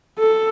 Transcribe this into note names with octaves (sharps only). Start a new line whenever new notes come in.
A4